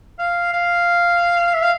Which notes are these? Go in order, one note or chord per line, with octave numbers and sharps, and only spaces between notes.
F5
F5
E5
F5